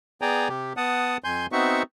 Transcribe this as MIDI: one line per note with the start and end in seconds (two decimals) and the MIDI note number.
0.22 0.48 59
0.22 0.48 68
0.22 0.48 74
0.22 0.48 79
0.22 0.48 80
0.22 0.48 82
0.49 0.73 48
0.49 0.73 67
0.77 1.17 59
0.77 1.17 78
0.77 1.17 81
0.77 1.17 87
1.24 1.46 41
1.24 1.46 80
1.24 1.46 84
1.24 1.46 91
1.52 1.83 59
1.52 1.83 60
1.52 1.83 63
1.52 1.83 66
1.52 1.83 76
1.52 1.83 85